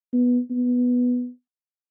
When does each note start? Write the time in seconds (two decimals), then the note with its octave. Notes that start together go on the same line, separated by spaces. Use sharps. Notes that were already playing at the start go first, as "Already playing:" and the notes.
0.13 B3
0.50 B3